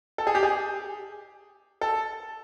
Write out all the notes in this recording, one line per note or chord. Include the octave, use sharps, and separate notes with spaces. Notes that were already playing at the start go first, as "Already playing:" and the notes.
A4
G#4
G4
G#4
A4